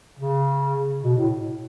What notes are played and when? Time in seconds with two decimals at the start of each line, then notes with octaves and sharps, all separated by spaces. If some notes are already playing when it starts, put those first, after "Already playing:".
0.19 C#3
1.04 B2
1.17 A2